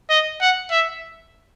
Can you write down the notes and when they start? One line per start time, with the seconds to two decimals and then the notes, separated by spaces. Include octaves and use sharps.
0.10 D#5
0.41 F#5
0.71 E5